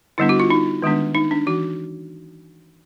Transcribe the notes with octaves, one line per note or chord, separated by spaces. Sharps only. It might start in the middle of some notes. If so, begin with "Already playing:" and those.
D3 G3 B3 D4 E4
F#4
F4
D#4
D#3 G#3 B3 D4
D#4
D4
E3 F#4